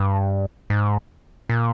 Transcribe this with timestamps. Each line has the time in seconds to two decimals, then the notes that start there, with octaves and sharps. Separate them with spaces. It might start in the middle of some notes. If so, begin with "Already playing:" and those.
Already playing: G2
0.70 G#2
1.49 A#2